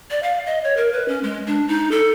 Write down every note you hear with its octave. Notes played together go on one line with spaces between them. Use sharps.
D5
F5
D#5
C#5
A#4
B4
C#4
G#3
D4
D#4
A4